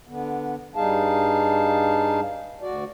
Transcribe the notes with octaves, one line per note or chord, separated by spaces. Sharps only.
D3 B3
G2 G3 D#4 G#4 F5 A5
D2 F#4 D5